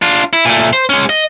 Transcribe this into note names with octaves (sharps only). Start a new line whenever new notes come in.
D4 F4
E4
A#2 A3
C5
G#3 C#4
D#5